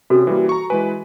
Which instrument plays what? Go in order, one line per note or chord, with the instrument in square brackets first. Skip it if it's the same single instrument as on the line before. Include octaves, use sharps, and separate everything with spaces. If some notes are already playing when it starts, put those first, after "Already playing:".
[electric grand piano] C3 C#4 [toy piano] F#4 A4
[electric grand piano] E3 G3 A#3
A#5 C#6
[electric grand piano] E3 G#3 B4 [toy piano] G#5